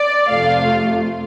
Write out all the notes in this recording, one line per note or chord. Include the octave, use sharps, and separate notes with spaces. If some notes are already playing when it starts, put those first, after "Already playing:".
Already playing: D5
F2 C3 A3 F4 F5